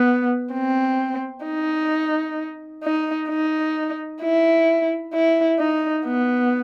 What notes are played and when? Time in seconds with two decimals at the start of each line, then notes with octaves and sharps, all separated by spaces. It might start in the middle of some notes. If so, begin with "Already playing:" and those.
Already playing: B3
0.53 C4
1.45 D#4
2.83 D#4
3.29 D#4
4.21 E4
5.13 E4
5.59 D#4
6.05 B3